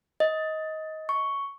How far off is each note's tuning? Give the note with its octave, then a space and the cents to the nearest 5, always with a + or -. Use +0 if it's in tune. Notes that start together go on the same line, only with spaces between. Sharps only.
D#5 +15
C#6 +5